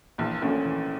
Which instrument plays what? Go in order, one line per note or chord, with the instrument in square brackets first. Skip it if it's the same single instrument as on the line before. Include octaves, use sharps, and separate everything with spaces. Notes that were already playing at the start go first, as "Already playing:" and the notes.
[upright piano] A#1 A#2 [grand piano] E3
[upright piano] A#1 A#2 [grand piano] A3 C#4 F#4
[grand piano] E3